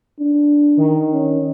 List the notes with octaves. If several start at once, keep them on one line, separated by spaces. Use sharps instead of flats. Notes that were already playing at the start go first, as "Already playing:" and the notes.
D4
D#3
C#4